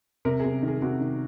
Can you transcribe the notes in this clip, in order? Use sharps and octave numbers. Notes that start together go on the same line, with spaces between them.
C3 A#4
C3 G#4
D#3
G#4
C3 F#4
D#3